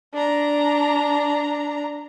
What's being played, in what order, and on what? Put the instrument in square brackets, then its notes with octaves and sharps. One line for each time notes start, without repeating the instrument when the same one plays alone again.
[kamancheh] D4 A#5